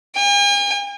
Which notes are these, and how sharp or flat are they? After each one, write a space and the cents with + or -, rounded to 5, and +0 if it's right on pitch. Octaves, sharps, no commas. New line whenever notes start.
G#5 -45